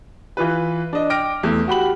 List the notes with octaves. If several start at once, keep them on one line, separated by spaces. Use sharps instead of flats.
E3 F4 B4
D4 D#5
G5 D6 F6 A#6 D7
E2 A3
F#4 G4 B5 F#7